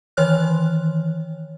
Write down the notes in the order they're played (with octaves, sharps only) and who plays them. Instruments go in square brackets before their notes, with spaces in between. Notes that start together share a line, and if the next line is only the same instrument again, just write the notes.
[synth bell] D#3 E3 C#5 F6 F#6